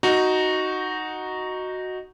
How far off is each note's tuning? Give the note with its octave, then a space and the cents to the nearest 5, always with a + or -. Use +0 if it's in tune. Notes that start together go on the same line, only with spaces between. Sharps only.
D#4 +0 F#4 +0